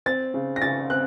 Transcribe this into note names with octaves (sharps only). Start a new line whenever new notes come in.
C4 A6
C#3
A#6
C#3 A6
C4 F#6